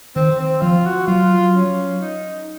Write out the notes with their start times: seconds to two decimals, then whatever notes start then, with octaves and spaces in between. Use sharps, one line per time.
0.16 D#3 C4
0.39 C4
0.62 F3 F4
0.85 F#4
1.07 F#3 F4
1.53 C#4
2.00 D#4